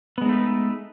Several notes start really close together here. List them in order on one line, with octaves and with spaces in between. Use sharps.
B3 G#3 D#4 A3 B4